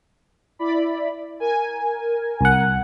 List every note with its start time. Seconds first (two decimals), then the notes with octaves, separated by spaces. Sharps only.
0.59 E4 D5 B5
1.40 A#4 G#5
2.41 C2 F#5